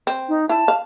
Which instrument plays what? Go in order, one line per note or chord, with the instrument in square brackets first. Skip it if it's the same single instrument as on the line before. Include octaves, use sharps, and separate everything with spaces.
[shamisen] C4
[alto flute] D#4
[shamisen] E4 [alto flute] A5
[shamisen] F5